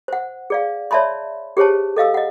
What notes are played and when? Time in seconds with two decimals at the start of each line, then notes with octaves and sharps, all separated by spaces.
0.08 C5 F#5
0.50 G#4 D5 F5
0.91 C#5 D5 E5 A5 B5 C6
1.57 G4 G#4 C5 C#5 A5
1.96 A4 D#5 F5 E6
2.14 D#5 F#5